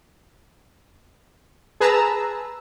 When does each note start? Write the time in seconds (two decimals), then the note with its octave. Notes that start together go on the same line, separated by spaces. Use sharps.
1.80 G#4 B4 A5 A#5 E6